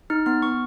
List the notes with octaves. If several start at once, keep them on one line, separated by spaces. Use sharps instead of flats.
D#4 F6
B3 F6
B3 C#6